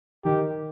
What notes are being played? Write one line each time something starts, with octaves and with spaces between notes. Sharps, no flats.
D#3 G4